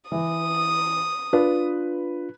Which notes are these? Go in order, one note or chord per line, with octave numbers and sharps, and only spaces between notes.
E3 D#6
D4 F4 B4